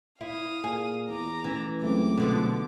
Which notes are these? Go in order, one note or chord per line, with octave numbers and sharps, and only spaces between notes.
E4 F5 D#6
A#2 G#4
E2 A#5 D6
A1 E3
C#2 F#3 A3 C4 D6
B2 D3 F3